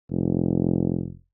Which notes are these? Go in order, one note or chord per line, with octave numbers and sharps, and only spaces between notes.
F1